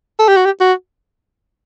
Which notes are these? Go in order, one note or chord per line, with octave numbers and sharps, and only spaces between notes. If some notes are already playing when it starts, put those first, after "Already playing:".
A4
G4
F#4
G4
F#4